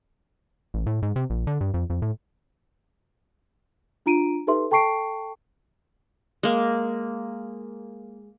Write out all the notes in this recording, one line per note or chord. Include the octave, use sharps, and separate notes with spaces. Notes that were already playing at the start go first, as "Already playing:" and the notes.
A1
A2
G#2
C3
A#1
D3
G2
F2
F2
A2
D4 F4 A#5 D7 D#7
D#4 G4 A4 B4 E5 C6
A4 G5 A5 C#6 C7 D7
G#3 A#3